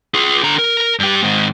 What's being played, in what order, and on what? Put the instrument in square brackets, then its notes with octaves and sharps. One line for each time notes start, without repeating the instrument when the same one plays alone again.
[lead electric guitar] F4 G#4
D3 A#5
A#4
G2 G4
G#2 D#3